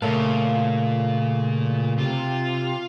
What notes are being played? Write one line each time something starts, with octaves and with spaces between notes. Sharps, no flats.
A#2 C#3 A3 A4 A#4 C#5 F5
C3 F4